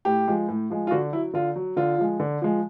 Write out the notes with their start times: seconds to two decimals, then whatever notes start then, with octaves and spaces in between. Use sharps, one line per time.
0.05 A2 G4
0.28 F3 G#3
0.48 A2
0.70 F3 G#3
0.87 F4
0.91 D3 F#4
1.12 F#3 E4
1.33 D3 F4
1.56 F#3
1.77 D3 F4
1.98 F3 G#3
2.20 D3
2.42 F3 G#3